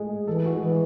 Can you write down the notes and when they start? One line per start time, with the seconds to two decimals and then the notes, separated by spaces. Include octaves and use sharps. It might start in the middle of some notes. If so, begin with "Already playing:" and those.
Already playing: G#3 A3 G#4
0.27 E3 A4
0.36 G#4
0.46 F#4
0.55 G#3 G#4
0.62 E3